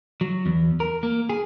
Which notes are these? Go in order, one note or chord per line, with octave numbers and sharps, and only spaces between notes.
F#3
E2
A#4
A#3
G#4